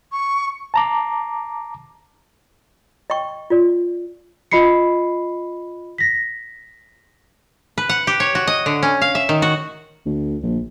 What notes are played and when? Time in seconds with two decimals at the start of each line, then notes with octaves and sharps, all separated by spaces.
0.12 C#6
0.74 A5 A#5 D6
3.10 D#5 G5 C#6
3.50 F4 D5
4.51 F4 D#5 B5 C7 C#7
5.98 A#6 B6
7.78 B4
7.89 F#5
8.07 G4
8.20 C#5
8.35 F#4
8.47 D#5
8.66 D3
8.83 C#4
9.01 F5
9.15 E5
9.29 D#3
9.42 F#4
10.06 D2
10.43 A#1